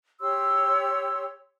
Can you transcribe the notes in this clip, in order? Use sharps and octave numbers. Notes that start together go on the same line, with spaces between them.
G4 C#5 C6 E6